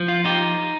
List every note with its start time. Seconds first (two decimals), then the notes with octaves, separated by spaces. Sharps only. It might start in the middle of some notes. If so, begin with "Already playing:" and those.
Already playing: F3
0.08 F4
0.25 D#4 G4